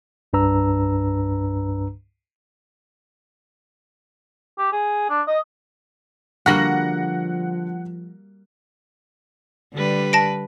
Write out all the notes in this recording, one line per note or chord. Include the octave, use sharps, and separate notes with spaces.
C2 G2 D4 B4 A#5 E6
G4
G#4
D4
D#5
D3 F3 G3 A#3 F#4 F#5 A#6 F#7
D3 G3 B4
A5 A#6 D7